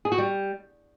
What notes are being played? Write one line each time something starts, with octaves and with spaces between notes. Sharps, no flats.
G#4
F#4
G3